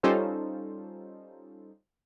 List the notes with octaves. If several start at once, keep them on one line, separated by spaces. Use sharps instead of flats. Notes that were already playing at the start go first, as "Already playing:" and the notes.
G3 C#4 D#4 F4 A4 C5